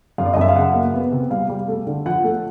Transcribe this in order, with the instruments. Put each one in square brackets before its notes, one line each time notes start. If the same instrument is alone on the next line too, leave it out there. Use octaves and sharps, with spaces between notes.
[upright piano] F#2 F5
D5
D#5
F#2 E5
F5
C#3 F#5
A#3
B3
C3
G3 F5
G3
A3
D3
F3 F#5
A3